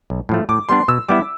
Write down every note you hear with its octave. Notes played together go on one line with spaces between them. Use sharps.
B1
A2 F3 A3
A2 D6
G3 B3 D4 C6
B2 E6
G3 B3 E4 D6